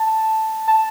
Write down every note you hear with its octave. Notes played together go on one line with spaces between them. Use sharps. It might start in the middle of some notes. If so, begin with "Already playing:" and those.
Already playing: A5
A5